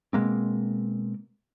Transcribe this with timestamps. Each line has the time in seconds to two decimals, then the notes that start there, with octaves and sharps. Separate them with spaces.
0.13 B2 G#3 A#3 C4